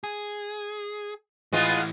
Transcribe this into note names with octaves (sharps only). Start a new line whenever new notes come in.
G#4
A2 E3 G#3 B3 F4